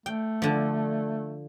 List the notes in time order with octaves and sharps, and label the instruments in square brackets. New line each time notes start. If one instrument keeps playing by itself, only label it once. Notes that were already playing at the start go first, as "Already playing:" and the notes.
[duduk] A3 [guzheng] G5
[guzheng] D3 F3